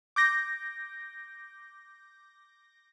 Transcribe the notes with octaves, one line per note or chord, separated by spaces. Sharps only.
D6 G6 A#6